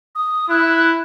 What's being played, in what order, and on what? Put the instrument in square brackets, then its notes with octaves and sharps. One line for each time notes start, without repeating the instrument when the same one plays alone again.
[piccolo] D#6
[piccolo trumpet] E4 [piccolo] F#6